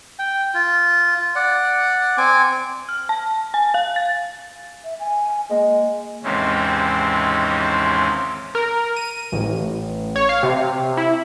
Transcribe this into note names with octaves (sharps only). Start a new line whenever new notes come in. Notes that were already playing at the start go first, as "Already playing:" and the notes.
G5
F4
D5 F#5
C4 G#5 D6
F6
A5
G#5
F5
A6
E5
G#5
G#3 A#3
D#2 G#2 C3 E3 C4 C#4
A#4
D#7
A1
C#5
F5
C3
E4